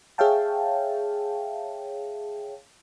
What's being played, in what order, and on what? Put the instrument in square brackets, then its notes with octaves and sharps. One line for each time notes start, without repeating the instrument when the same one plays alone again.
[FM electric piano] G#4 C#5 E5 F5 G5 A5